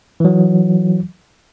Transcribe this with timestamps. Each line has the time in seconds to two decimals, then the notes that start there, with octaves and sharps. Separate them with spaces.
0.20 E3 F#3